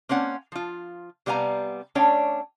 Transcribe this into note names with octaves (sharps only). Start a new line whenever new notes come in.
A#3 C4 C#4 F#5
F3 F4
C3 G3 B3 F5 G#5 A#5
A3 C#4 D4 C#5 F5 G5